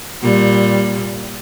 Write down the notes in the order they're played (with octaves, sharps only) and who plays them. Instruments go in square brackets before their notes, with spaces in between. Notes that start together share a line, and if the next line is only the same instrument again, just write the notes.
[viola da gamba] A#2 G3